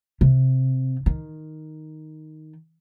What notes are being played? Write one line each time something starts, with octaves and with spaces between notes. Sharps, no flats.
C3
D#3